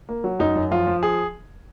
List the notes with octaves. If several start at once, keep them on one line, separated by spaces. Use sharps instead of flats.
A#3
F#3
F#2 D#4
F#2
F3 F4
F3
G#4